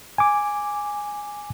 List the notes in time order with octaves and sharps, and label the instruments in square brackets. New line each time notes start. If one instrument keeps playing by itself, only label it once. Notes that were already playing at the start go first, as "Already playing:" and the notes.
[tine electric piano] G#5 D6